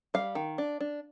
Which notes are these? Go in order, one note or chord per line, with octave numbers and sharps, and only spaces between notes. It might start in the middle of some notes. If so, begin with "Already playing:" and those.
G3 F5
D#3
D4
D4